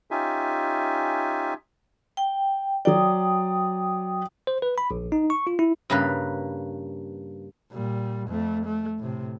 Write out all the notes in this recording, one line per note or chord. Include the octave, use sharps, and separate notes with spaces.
C#4 D#4 F4 G4 E5 G#5
G5
F#3 D5 G5 D#6
C5
B4
B5
A#1
D#4
C#6
F4
E4
G2 C#3 A#3 B4
A#2 G3
F2 A3
A3
A2 C3